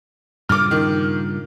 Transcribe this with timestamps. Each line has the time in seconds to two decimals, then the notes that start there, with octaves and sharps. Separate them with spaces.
0.49 G2 A#2 C#3 D6 F6
0.71 D#3